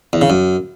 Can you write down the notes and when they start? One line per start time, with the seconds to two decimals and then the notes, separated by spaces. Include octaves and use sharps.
0.13 E2
0.21 C#3
0.30 F#2